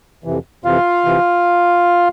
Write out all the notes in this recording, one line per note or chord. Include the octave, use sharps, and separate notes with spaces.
F2 C3 E3
F2 C3 E3 F4 F5
C3 E3